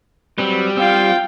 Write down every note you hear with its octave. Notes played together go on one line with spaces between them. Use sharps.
F#3 G3 C4 B4
C4 F4 F5 G5